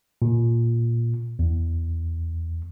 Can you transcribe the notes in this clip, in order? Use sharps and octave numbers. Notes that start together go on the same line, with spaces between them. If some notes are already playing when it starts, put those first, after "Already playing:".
A#2
E2